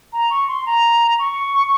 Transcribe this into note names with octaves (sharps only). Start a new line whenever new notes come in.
A#5
C#6
C6
A#5
C#6